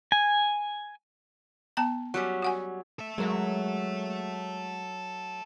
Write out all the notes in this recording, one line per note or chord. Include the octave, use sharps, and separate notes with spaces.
G#5
B3 A5 A#5
F#3 G3 C#4
F#4 F#5 G#5
A4 E5
F#3 G#3 A#4